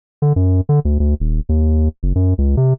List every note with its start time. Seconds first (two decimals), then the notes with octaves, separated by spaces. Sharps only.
0.22 D3
0.36 F#2
0.69 D3
0.85 D2
1.00 D2
1.20 D#1
1.49 D#2
2.03 F#1
2.15 F#2
2.38 C#2
2.57 C3